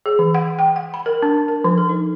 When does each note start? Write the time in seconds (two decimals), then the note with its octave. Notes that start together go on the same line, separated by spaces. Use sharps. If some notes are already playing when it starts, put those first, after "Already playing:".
0.06 G#4
0.19 E3
0.35 F#5
0.59 G5
0.76 F#5
0.94 B5
1.06 A#4
1.23 D4
1.48 A#4
1.64 F3
1.78 A4
1.89 D#4